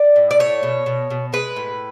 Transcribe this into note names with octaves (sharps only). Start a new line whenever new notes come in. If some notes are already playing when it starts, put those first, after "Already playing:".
Already playing: D5
A2
D5
A3 C#5
B2
B2
B2
G#3 B4
A2